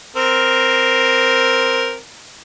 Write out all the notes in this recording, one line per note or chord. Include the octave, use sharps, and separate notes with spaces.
C4 A#4